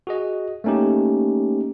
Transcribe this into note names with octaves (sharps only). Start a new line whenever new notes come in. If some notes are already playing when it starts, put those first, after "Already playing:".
F#4 G#4 D#5
A3 A#3 C#4 D#4 G4